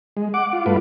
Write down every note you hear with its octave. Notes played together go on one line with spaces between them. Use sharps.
G#3
F#5 D6
F4
G2 A3 F4 B4